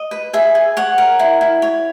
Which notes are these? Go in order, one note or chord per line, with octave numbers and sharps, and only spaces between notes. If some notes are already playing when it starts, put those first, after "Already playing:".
Already playing: D#5
B4
G#4 E5
G#4
C#5 F#5
A#4
E4
E4
C#5